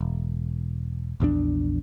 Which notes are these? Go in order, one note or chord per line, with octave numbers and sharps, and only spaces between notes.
E1
A#1 E2 E3 D4